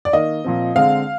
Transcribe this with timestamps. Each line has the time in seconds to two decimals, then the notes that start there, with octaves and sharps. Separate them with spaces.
0.05 D5
0.13 D#3 A#3 D#5
0.44 A#2 F3 C4
0.75 D3 G#3 C4 F5